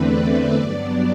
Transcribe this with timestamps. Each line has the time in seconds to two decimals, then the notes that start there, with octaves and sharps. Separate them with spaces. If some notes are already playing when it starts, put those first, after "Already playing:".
Already playing: E2 D3 A3 C4 B4 D5
0.19 E5
0.53 G2 F#3 B3 D4 D5